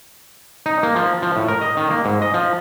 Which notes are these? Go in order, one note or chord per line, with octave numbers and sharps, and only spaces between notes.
D#4
A#3
F3
F3
A2
A#4
D#5
D#3
A#3
G#2
D#5
F3